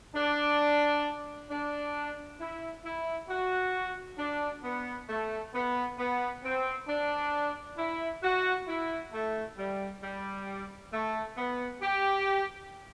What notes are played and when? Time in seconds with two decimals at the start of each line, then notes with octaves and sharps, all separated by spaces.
0.15 D4
1.50 D4
2.39 E4
2.84 E4
3.29 F#4
4.18 D4
4.63 B3
5.09 A3
5.53 B3
5.98 B3
6.43 C4
6.88 D4
7.77 E4
8.23 F#4
8.67 E4
9.12 A3
9.57 G3
10.02 G3
10.92 A3
11.37 B3
11.82 G4